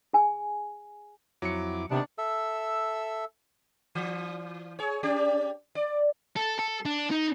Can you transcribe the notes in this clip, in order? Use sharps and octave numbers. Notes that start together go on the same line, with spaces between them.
G#4 G#5
F2 F#3 E4 D6 C#7
C3 D#3 B3 D4
A4 E5 E6
E3
G#4 C#5
C#4 G4 D5
D5
A4
A4
D4
D#4